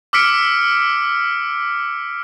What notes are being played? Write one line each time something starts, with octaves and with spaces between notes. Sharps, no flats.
D6 E6 F6 B6 C#7 D7